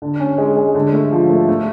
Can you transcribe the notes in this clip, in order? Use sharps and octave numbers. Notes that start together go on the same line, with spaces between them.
D3
C#4
G#3
G#3
D3
A3
F3
A3
A3